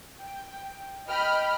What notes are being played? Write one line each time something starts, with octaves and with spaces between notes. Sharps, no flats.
G5
D#5 G5 B5 F6